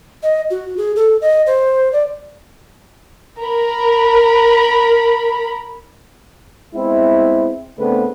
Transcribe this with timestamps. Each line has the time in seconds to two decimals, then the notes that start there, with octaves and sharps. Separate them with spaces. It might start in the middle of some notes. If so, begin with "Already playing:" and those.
0.23 D#5
0.51 F#4
0.77 G#4
0.96 A4
1.21 D#5
1.46 C5
1.93 D5
3.39 A#4 B5
6.74 G#3 B3 C4 E4
7.79 C#3 A3 B3 C4 D4 B4